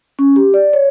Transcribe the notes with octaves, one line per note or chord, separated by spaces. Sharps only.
C#4
G4
D5
C#5